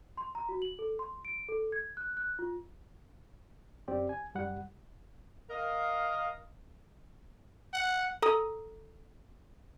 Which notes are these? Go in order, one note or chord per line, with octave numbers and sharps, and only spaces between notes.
C6
A#5
F#4
F#7
A4
C6
D7
A4
G#6
F#6
F#6
F4
F#2 C4 G4 D5
G#5
F#2 G3 F#5
A#4 D#5 F5
F#5
A4 A#5 D#6